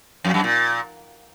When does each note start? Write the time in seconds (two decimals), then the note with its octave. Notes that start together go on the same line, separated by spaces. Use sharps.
0.24 F2
0.34 F#2
0.44 A#2